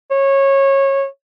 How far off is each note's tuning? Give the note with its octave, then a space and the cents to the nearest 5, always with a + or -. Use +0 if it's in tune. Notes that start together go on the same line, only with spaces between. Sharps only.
C#5 -20